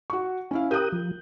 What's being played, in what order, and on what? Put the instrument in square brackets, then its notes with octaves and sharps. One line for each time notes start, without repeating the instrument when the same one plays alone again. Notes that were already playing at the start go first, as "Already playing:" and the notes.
[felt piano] F#4 C#6
C#4 E4 F5
[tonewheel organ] G4 A#4 D#6 [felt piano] F#6 G6
[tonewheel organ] F3